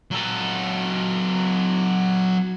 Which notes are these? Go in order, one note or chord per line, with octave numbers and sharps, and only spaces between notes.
F#3 A4